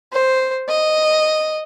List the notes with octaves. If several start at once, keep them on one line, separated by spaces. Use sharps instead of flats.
C5
D#5